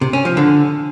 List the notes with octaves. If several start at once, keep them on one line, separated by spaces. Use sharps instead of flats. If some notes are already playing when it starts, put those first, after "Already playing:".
C3
C#4
F3
D3